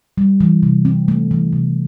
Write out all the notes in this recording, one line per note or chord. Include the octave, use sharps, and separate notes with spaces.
G3
E3
C3
C4
A3
E3
C3